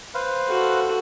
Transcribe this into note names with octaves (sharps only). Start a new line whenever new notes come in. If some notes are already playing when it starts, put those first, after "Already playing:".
B4 C5 F5
F#4 A4